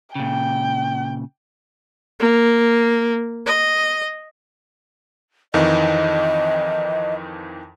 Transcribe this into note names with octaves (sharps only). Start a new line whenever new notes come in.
A#2 C#3 G5
A#3
D#5
F2 D#3 E3 D#5